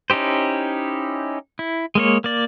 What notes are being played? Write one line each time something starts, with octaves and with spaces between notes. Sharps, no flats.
C#4 D#4 E4 G4 C5
E4
G#3 A#3 C#5
A#3 D5